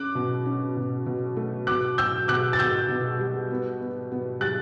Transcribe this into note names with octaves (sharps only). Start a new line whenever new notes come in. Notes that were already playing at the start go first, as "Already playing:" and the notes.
Already playing: C#4 D6 F#6
B2
C#4
B2
B2
A3
B2 D6 F#6
B2 E6 G6
B2 D6 F#6
A6
B2 E6 G6
B2
G3
B3
B3
B3
G3 F#6 A6